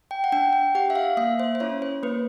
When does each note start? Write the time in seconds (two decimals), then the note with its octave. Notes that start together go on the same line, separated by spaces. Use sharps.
0.11 G5
0.24 F#5
0.32 D4 G5
0.53 G5
0.75 G4 F#5
0.90 E5
0.96 F5
1.17 A#3 E5
1.40 C5
1.55 C5
1.60 C#4 E4 C#5
1.82 C5
2.03 A#3 B4